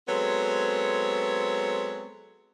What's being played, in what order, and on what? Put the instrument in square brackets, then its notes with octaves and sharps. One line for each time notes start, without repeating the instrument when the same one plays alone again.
[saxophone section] F#3 G#3 B3 C4 A4 C#5